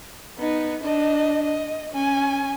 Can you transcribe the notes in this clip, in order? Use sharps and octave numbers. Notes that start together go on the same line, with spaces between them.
B3 D#4
D4 D#5
D#5
C#4 G#5